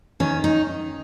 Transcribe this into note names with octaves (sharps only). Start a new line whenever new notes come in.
D#3 C#4
D#4